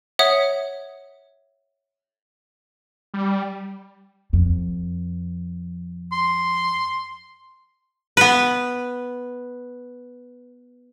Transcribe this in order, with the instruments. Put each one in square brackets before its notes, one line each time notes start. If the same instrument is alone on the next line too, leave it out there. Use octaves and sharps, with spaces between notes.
[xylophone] C#5 E5 F#5 D#6
[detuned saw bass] G3
[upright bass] F2
[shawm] C6
[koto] B3 B4